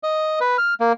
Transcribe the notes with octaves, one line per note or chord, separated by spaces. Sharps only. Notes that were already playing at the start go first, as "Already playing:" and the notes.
D#5
B4
F6
A#3